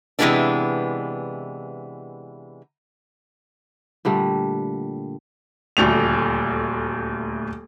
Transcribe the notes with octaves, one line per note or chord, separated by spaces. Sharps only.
C3 E3 F3 G#3 B3 D4
A#2 D3 G3 A3
D#1 D2 A3 F7